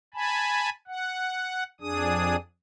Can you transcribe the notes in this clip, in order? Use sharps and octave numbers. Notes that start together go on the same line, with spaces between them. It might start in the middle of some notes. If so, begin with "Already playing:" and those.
G#5 A5 B5
F#5
F2 D4 G#4 D#6